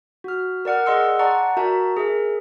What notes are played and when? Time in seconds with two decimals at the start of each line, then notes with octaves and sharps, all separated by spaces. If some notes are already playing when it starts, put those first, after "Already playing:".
0.24 F#4 F6
0.65 A#4 D5 F#5 F6
0.86 G#4 D#5 F#5 C6 E6 C#7
1.19 D5 F#5 A5 A#5 C#6
1.57 F#4 A#4 E5 A5 A#5
1.97 G#4 A#4 E5